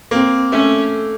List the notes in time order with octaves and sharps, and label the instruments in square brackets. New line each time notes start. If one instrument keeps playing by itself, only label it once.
[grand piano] A#3 [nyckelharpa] C4
[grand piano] A3 [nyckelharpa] C#4